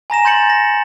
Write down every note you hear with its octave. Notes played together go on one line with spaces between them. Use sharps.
G#5 A#5 A#6 E7
C6 G6 A6 A#6 C#7 F#7
A#6